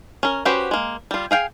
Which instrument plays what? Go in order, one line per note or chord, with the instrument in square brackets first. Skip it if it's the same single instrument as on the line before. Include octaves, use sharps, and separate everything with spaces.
[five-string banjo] C#4 A#4
C#4 F#4 G4 B4 C5
G#3 A#3
G3 F4
G#4 F5 G5 G#5